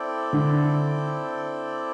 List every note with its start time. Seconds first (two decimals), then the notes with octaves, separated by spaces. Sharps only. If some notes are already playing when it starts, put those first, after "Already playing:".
Already playing: C4 E4 A4 D5 G5
0.33 D3